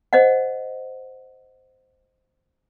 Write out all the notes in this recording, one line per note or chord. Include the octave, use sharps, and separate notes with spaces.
C5 D#5 F#5